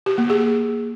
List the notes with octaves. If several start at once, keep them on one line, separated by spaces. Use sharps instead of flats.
G4
A#3
G#4